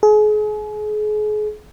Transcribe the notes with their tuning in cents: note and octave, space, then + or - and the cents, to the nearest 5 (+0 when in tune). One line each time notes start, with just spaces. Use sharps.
G#4 +35